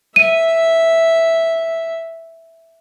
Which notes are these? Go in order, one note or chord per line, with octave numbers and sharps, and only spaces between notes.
E5 D#7